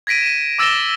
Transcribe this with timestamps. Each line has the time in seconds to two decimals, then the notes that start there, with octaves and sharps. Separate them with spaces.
0.07 G#6 A#6 B6 D7 D#7
0.22 D#7 E7
0.59 D6 E6 A6 A#6 E7 G7